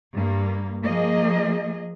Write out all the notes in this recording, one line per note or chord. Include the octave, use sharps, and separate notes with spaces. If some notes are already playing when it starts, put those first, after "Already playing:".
G2 A#3
F3 A#3 G#4 D#5